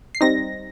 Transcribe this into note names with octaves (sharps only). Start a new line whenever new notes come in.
C7
G3 C4 D#4 A#6